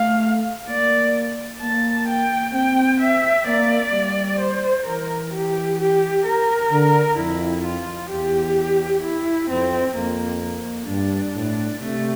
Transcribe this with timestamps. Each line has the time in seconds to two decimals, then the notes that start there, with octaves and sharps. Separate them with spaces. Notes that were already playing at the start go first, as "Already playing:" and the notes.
Already playing: A3 F5
0.68 A#3 D5
1.61 A#3 A5
2.08 G5
2.53 C4 G5
3.00 E5
3.47 A#3 D5
3.93 G3
4.39 C5
4.86 E3 A#4
5.32 G4
5.78 G4
6.24 A#4
6.70 D3
7.17 F2 E4
7.64 F4
8.10 E2 G4
9.03 E4
9.49 F2 C4
9.95 F2 A#3
10.42 A#3
10.88 G2 D4
11.35 A2
11.80 C3 A3